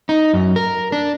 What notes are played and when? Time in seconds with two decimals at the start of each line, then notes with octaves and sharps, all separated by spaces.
0.09 D#4
0.33 F#2
0.56 A#4
0.92 D4